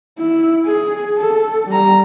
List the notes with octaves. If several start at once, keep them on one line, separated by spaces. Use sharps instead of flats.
E4
G#4
A4
G3 A#5